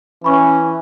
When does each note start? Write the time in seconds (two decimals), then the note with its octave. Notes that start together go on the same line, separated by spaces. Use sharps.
0.24 E3 C#4 B5 C#6